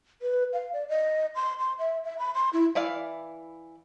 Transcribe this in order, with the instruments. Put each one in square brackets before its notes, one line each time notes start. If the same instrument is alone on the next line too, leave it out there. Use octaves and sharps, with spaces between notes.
[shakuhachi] B4
F5
D5
D#5
C6
C6
E5
E5
B5
C6
E4
[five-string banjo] E3 E4 D5 F5